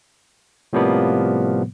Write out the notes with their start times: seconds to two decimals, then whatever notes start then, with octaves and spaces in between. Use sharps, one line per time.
0.73 A2 C3 F3 G3 A#3 B3